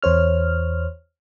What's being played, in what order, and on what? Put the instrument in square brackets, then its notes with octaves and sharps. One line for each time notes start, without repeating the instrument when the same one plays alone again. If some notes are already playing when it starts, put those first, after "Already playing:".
[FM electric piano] E2 C5 C#5 F6